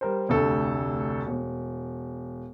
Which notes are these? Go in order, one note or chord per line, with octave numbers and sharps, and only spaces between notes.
G3 A#4 C5
F1 D2 A4
E1